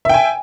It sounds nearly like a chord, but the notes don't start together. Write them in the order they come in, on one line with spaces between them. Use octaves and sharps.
E5 G5 G#5